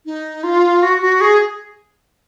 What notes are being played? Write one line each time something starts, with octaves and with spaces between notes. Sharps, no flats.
D#4
F4
F#4
F#4
G#4